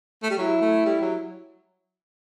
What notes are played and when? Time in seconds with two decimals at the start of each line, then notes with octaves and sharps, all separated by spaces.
0.23 A3
0.30 G3
0.38 F#3 E4
0.61 A3
0.85 G3
1.01 F#3